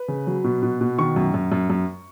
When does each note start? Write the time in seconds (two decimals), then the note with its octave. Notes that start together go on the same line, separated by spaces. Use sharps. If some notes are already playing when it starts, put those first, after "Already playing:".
Already playing: B4
0.08 C#3
0.27 F#3
0.44 B2
0.63 B2
0.81 B2
0.98 D#3 C#6
1.16 F#2
1.34 F#2
1.52 F#2
1.70 F#2